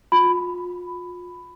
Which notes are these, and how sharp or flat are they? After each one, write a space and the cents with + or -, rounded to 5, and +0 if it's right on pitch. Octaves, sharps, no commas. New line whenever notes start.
F4 +35 B5 +10